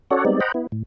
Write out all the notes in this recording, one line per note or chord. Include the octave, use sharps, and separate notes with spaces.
C#4 F#4 A4 C#5 D5 F#5
G3 G#3 B3 C4 D#4 D5
C5 D#5 F#5 G5 A#5 B5
B3 E4
A2